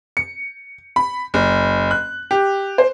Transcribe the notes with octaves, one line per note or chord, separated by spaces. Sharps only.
C#7
B5
F#1
F#6
G4
C5